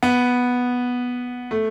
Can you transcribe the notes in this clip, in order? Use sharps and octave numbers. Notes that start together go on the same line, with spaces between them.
B3
A3